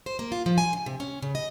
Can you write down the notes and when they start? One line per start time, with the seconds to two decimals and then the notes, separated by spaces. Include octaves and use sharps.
0.06 C5
0.19 A#3
0.32 F4
0.46 F3
0.58 G#5
0.73 C#3
0.86 C3
1.00 C#4
1.22 C#3
1.35 D#5